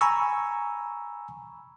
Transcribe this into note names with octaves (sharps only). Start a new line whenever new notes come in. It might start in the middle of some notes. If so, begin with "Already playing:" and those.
G#5 A#5 B5 C#6 E6